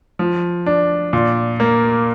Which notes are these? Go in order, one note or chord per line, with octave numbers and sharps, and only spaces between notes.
F3
D4
A#2
A#3